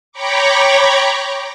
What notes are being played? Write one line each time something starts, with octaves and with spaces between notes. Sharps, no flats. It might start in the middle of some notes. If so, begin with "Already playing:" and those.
C#5 G5 A#5 B5 C#6 D6